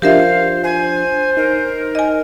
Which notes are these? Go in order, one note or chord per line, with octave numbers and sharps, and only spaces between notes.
F3 D4 F4 G4 A#4 C5 E5 F5
C5 G#5
D#4 A#4
D#5 G#5